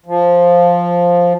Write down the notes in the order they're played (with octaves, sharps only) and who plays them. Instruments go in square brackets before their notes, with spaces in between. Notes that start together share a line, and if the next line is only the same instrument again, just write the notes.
[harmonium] F3